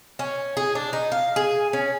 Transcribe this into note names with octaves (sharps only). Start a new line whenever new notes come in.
C#4
G#4
D4
D#4
F5
G#4
C#4